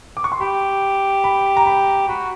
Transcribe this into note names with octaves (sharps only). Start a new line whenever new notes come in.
D6
C#6
C6
G4 B5
B5
A#5
B5
F#4 B5